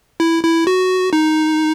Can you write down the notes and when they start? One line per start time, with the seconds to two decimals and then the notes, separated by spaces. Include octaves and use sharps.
0.20 E4
0.43 E4
0.67 F#4
1.13 D#4